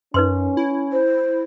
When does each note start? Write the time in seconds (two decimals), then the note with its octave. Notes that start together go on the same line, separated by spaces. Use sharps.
0.14 F#2 C#4 D#4 B4 C6
0.57 E4
0.92 C5